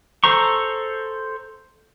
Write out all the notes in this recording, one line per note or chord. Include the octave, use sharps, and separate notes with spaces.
A4 C5 A#5 C#6